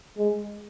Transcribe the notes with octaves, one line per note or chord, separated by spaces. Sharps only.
G#3